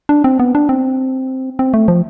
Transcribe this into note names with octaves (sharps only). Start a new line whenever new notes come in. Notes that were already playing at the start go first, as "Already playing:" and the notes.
D4
C4
B3
D4
C4
C4
A3
F3